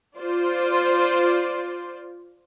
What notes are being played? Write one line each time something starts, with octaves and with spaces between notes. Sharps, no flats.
F4 C5 D5